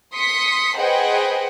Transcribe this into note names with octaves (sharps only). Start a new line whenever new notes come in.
C6 D#6 B6 C#7
G#4 B4 C5 D#5 F#5 G5